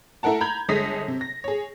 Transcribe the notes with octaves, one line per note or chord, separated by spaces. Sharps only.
A3 E4 A4 A#4 F#5 A5
A#5 B5 G6 G#6
G1 G#3 A4 D#6 A#6 B6
C3
A#6
G#4 C#5